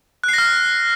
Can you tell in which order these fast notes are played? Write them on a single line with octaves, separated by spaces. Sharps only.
F#6 C7 A#6 F6